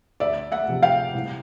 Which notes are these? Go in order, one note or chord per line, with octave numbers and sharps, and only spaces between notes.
D2 D5 E5
E5 F#5
C3 F3
F5 G5
C2